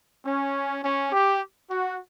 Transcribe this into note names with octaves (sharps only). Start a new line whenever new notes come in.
C#4
C#4
G4
F#4